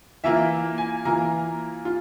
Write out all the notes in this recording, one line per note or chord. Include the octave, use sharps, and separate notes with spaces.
E3 A#3 F4 E5
G#5
E3 A#3 F4 A#5
F4